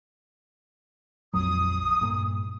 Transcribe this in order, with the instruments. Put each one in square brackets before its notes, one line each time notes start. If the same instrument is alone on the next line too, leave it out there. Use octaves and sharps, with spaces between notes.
[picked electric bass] A#1 F2 F#3 [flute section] D#6
[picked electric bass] G2 A#2